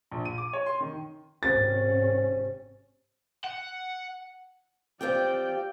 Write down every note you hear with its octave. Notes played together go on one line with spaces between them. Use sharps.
A#1
D#7
D6
C#5
C6
D#3
G#1 C3 C#4 A6
F#5
C4 F4 G4 D5 G5